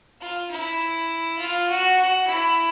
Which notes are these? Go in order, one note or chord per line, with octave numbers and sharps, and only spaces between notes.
F4
E4
F4
F#4
F#4
E4